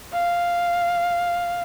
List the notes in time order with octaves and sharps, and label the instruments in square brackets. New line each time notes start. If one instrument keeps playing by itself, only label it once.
[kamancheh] F5